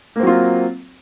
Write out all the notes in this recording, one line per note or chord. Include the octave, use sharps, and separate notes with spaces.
F#3 A#3 C4 F4